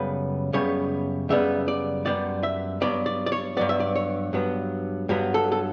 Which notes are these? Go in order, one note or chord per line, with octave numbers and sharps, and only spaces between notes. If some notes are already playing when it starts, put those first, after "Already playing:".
Already playing: F#2 C#3 G3 B3 B4
F#2 C#3 G3 B3 C#5
F#2 C#3 G3 B3 E5
D5
F#2 C#3 G3 B3 D5
E5
G2 F#3 B3 D5
D5
D5
C#5
G2 F#3 B3 D5
E5
D5
C#5
G2 F#3 B3
G2 F#3 B3
A4
A4